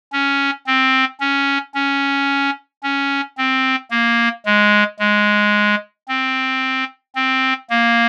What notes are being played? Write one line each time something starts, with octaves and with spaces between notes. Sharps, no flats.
C#4
C4
C#4
C#4
C#4
C4
A#3
G#3
G#3
C4
C4
A#3